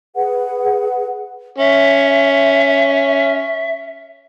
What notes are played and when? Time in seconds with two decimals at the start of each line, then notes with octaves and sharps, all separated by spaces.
0.16 G#4 B4 F#5
1.58 C#4 E5